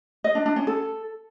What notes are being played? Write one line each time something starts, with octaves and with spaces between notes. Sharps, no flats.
D#5
D4
D4
C#4
A4